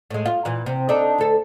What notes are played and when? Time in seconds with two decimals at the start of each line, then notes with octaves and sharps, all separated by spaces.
0.10 A2 G#3
0.26 F4
0.45 A#2 E3
0.66 C3
0.89 D4 D#4 A4
1.18 D2 A4